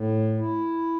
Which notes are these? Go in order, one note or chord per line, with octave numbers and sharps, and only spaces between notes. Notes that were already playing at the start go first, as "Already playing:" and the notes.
Already playing: A2
E4